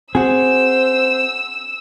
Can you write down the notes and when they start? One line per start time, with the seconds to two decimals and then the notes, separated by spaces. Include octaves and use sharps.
0.15 C4 F#4 G#4 C5 E6